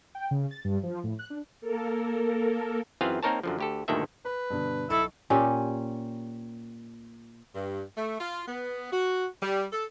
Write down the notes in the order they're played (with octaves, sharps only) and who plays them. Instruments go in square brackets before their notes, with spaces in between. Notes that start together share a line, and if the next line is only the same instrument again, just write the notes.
[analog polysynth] G5
C#3
A6
G2
F3
A2
F#6
D4
[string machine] A#3 A4 A#4
[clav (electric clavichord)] F#2 E3 C4 F4 G#4 F5
A#3 C4 D#4 A#4 C#5 A5
F#2 D3 F3
D2 G4 A4
D2 G2 A#2 D#3 A4 E5
[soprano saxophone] B4 [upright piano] B5
[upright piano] G2 B2 D3
[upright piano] B1 C#6 [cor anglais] E4 [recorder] A4
[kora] A#2 C#4 G4
[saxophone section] G2
A3
F4
B3
F#4
G3
A4